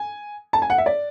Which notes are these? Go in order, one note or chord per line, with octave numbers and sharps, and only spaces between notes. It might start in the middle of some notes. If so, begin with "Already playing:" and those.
Already playing: G#5
A5
G#5
F#5
E5
D5